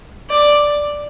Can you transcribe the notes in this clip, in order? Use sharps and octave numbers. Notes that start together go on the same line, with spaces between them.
D5